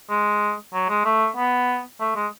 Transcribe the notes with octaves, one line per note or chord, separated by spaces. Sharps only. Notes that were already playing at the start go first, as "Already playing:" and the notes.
G#3
F#3
G#3
A3
B3
A3
G#3